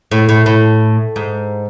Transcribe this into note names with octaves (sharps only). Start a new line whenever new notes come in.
A2
A2
A2
G#2